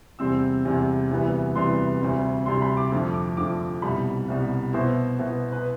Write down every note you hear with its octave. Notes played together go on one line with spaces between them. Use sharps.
E2 C3 G3 C4 E6
E2 C3 G3 C4
D2 C3 E3 G3 B3
D2 C3 E3 G3 B3 C6
D2 C3 G3 C4
D2 C3 G3 C4 C6
B5
D6
F2 D3 F3 A3
D6
F2 D3 F3 A3 D6
C2 B2 G3 B5
C2 B2 G3
B2 B3 E4 C5
B2 B3 E4
B4